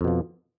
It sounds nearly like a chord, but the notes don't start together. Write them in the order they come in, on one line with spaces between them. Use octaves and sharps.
F2 B2 F3